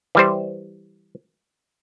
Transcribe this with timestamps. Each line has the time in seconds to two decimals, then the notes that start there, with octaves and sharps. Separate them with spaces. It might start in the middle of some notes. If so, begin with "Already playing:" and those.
0.15 E3 G3 C5